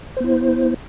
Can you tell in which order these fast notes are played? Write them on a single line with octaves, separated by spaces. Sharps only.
C5 B3 E4